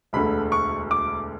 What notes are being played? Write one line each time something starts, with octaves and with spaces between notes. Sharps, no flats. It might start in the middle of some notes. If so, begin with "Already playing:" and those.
E1 D2 D3 B5
C#6
D6